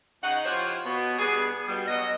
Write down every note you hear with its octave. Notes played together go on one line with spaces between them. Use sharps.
C#3 D#4 F#5
F3 E4 F4 G4 C5 C#5
B2 B3
G3 B3 D4 G#4
G2 B2 G3
B2 F#3 D#5